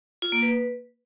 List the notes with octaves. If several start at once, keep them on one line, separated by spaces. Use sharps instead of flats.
F4
A#3
B4